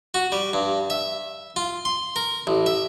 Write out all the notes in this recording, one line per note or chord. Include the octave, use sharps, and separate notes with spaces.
F#4
G3
G2
E5
F4
C6
A#4
A1
E5